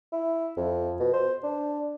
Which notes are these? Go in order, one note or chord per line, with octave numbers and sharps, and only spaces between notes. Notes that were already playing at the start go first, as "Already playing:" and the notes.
E4
F2
B2
C5
D4